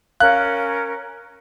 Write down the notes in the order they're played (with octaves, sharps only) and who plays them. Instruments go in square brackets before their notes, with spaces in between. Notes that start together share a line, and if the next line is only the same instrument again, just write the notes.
[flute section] C#4 A#4 [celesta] F5 [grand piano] F#6